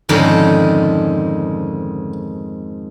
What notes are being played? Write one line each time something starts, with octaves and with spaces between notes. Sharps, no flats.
F2 G#2 D3 D#3 C#4